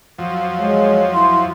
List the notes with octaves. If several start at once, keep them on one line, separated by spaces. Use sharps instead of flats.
F2 F3 F#3
G#3 C#5
E4 C6